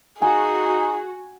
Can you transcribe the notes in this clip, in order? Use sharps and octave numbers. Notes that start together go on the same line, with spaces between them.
D#4 F#4 G#4 G#5